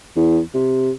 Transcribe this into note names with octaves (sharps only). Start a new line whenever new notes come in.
E2
C3